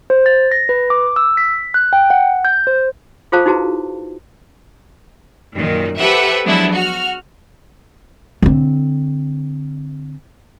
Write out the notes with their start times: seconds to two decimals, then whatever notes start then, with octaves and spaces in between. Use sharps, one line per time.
0.10 C5
0.26 A6
0.51 A#6
0.69 B4
0.90 D6
1.16 E6
1.37 B6
1.74 F#6
1.93 G5
2.10 F#5
2.45 G6
2.67 C5
3.32 F4 G#4 A4 C5 F5 A5
3.46 D#4 E4 F#4 G#4 B4 A5
5.55 F#2 A#2 D#3
5.99 G4 A4 B4 C5 E5 F#5
6.45 F3 F#3 G#3 B3 D4 E4
6.73 F#4 F6
8.42 D3 C4